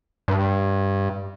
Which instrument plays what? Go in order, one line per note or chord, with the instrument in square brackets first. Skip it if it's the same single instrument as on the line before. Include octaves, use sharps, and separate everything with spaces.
[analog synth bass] G2